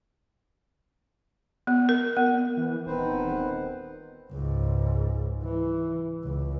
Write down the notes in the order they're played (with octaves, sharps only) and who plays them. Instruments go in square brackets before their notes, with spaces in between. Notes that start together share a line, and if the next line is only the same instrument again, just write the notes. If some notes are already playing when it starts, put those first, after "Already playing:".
[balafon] B3
A#4
B3
[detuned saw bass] E3
[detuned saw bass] D#1 [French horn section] D#3 B3 [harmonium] C4 B4 C5
[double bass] C#2 G#2
E3
C#2